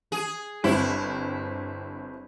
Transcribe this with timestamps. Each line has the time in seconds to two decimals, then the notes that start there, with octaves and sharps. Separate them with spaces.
0.12 G#4
0.64 G1 C4 E4